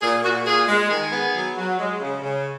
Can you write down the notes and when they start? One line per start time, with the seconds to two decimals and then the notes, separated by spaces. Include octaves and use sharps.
0.02 A#2 G#4
0.23 A#2 F#4
0.45 A#2 G#4
0.67 G#3
0.90 D#3 G#4
1.12 B3
1.34 F#3
1.56 F#3
1.78 G#3
2.00 C#3
2.22 C#3